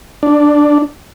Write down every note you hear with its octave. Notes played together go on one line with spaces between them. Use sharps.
D4